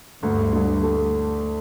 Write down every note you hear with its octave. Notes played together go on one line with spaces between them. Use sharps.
D2 G2
D2
A3